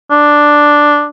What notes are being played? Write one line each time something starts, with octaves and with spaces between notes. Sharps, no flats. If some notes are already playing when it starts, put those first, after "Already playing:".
D4